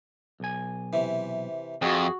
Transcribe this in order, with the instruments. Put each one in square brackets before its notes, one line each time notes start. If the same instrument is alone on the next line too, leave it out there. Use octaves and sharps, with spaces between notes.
[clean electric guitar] B1 G#5
[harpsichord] C3 E3
[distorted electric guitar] F2 [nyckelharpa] F#4 [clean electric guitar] G#4